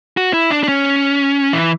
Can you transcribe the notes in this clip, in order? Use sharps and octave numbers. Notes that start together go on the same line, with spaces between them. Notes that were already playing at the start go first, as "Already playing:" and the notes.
F#4
E4
D4
D4
C#4
E3